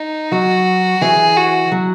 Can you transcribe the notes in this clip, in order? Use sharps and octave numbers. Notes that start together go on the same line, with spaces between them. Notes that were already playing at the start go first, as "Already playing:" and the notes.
Already playing: D#4
F#3 F#4
E3 G#4
F#4
F#3